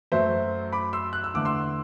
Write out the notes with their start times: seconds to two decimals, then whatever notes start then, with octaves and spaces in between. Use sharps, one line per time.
0.12 F#2 F#3 A3 C5 E5
0.72 B5 D6
0.93 C6 E6
1.13 F#6
1.24 E6
1.34 E2 D3 A3 D6
1.45 C6 E6